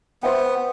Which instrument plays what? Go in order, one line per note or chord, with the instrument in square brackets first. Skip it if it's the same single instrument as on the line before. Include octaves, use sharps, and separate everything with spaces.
[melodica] B3 [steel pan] C5 E5 G5